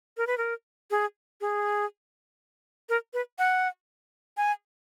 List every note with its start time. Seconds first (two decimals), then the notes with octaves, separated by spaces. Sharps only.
0.17 A#4
0.27 B4
0.38 A#4
0.91 G#4
1.41 G#4
2.89 A#4
3.13 B4
3.39 F#5
4.37 G#5